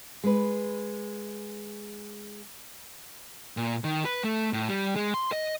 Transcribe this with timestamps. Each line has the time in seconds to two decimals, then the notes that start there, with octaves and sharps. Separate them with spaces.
0.23 G#3 B4
3.57 A#2
3.84 D#3
4.05 B4
4.24 A3
4.53 A2
4.69 G3
4.96 G#3
5.14 C6
5.32 D#5